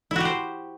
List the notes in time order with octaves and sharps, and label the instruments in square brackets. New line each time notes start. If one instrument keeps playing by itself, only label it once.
[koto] E4
F#4
G4
C5